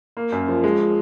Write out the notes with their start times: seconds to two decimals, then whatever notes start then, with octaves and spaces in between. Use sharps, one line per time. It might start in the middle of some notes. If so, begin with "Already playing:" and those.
0.17 A#3
0.32 F#2
0.48 F3
0.64 G#3